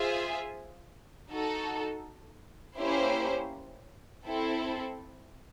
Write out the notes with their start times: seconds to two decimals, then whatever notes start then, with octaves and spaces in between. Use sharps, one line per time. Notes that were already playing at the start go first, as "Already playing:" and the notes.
Already playing: F4 G#4 C5 E5 G#5
1.30 D#4 F#4 A4
2.78 A#3 C#4 E4 G4 C5
4.26 C4 E4 A4